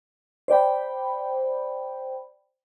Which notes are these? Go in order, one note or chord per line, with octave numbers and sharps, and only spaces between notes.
C5 D5 G5 B5